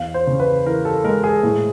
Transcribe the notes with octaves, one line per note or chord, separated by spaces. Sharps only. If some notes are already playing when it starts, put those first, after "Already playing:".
Already playing: E2 F5
C5
C#3
B4
E3 A#4
A4
G#3 A#4
G#4
A2